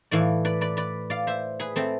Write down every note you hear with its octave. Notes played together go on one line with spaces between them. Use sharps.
A2 E3 D5 F5
B4 D5
B4 D5
B4 D5
D5 F5
C5 E5
G#4 B4
A3 C4